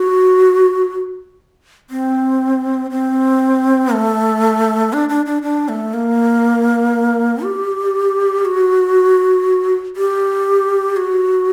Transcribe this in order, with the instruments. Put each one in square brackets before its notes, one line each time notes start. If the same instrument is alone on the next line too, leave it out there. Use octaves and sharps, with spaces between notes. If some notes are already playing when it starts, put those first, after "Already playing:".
Already playing: [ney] F#4
C4
C4
A3
D4
D4
D4
D4
A3
A#3
G4
F#4
G4
F#4